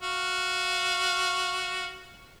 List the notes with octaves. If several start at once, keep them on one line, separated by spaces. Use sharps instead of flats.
F#4 F5